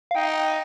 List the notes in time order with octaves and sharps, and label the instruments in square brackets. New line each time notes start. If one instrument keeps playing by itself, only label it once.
[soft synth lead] F5
[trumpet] D#4 [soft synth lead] G5